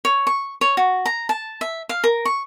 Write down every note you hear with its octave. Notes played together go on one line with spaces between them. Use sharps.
C#5
C#6
C#5
F#4
A#5
A5
E5
F5
A#4
C#6